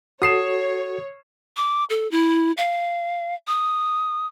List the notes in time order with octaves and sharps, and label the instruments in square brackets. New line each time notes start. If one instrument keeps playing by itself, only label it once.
[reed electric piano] F#4 A4 [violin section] C#5 [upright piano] D#6 C7 E7
[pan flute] D6
A4
E4
F5
D#6